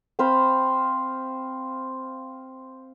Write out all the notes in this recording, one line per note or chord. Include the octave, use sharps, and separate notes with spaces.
C4 C5 F5 B5